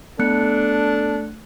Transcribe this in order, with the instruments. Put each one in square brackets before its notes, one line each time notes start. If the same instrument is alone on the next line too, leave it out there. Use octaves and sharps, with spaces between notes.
[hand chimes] A3 F#6 C#7 [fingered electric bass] B3 [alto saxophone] D4 [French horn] A4